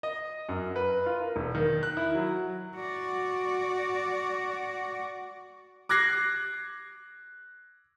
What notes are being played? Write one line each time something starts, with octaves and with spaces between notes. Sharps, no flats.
D#5
F#2
B4
F4
A#4
E1
D#3
F#6
E4
F#3
F#4 D5
D6 F#6 G#6 A#6 C7